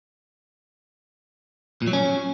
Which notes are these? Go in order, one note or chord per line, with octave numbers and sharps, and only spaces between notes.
A#2
F#3
C#4